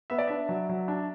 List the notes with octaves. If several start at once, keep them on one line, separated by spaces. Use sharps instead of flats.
B3 E5
D5
D4 E5
F#3
F#3
D4